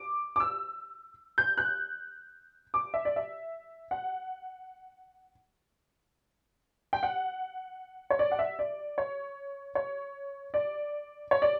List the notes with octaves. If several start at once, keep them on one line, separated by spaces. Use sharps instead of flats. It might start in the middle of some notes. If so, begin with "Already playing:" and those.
Already playing: D6
D6
E6
G6
F#6
D6
E5
D5
E5
F#5
G5
F#5
C#5
D5
F#5
E5
D5
C#5
C#5
D5
C#5
D5